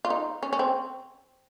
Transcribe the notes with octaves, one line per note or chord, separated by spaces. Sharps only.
F4
D#4
C#4
C#4
C4